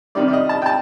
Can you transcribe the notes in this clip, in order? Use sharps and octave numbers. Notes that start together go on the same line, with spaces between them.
C3 D#3 G3 D5
D5
D#5
A5
G5
A5